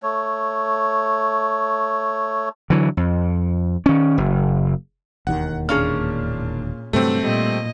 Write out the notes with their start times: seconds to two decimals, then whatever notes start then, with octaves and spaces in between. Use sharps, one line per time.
0.03 A3 C#5
2.70 D3 E3 F#3
2.97 F2
3.86 D#3 C#4
4.18 F#1
5.27 E1 D#2 D#3 F#5
5.69 A#2 A#3 C#4 D4 G#4 F6
6.93 G2 C3 F#3 A3 C4
7.23 A#2 G3 D#5